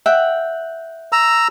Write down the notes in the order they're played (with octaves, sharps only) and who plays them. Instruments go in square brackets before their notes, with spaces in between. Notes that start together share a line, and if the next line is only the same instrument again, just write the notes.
[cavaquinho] E5 F#5 G5
[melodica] A#5 E6